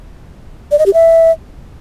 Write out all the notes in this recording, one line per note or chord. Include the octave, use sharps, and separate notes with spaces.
D5
D#5
G4
E5